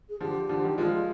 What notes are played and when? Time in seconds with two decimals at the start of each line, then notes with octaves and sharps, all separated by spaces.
0.09 G#4
0.20 D3 F3 G4
0.49 D3 F3
0.64 D#3 G3
0.78 F3 G#3 F4